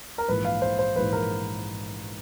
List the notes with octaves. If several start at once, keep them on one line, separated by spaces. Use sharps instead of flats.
A#4
A#1 G#2 E3 B4
F5
C5
C5
A#1 G#2 E3 B4
A#4